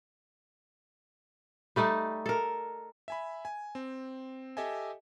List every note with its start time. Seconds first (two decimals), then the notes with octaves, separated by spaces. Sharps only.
1.76 G3 A3 D#4 D5
2.26 A4 A#4
3.08 E5 G#5 B5
3.45 G#5
3.75 C4
4.57 G4 A4 D#5 E5 G#5